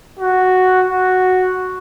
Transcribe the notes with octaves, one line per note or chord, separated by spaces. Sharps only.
F#4
F#4